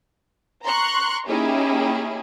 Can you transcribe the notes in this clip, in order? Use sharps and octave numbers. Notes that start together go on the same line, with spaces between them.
A#5 C6 C#6 F#6
A#3 C#4 D#4 E4 G4 G#4